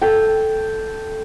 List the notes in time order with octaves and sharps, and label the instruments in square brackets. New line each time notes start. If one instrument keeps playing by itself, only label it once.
[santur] A4 G5